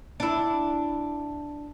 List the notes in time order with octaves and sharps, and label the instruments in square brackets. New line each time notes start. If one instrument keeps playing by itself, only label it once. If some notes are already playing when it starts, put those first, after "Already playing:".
[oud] D4 E4